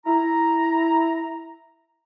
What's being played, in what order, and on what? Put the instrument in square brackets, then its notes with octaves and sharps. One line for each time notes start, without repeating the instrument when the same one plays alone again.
[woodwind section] E4 A#5